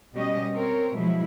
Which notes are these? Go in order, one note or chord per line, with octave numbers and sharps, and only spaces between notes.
B2 G3 C#4 G4 D#5
C4 A#4 C#5
B2 F3 F#3 G#3 E4